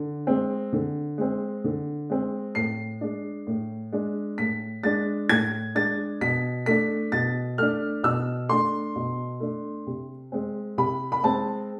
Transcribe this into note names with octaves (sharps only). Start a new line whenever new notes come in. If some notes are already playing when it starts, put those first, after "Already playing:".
Already playing: D3
G#3 C4
D3
G#3 C4
D3
G#3 C4
A2 C7
G#3 D4
A2
G#3 D4
A2 B6
G#3 D4 A6
A2 G#6
G#3 D4 A6
B2 B6
A3 D4 B6
B2 A6
A3 D4 F6
B2 E6
A3 D4 C6
B2
A3 D4
C3
G#3 C4
C3 B5
B5
G#3 C4 A5